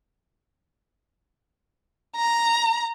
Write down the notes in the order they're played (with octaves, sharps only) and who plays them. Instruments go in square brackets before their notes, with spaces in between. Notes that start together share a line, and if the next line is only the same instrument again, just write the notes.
[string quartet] A#5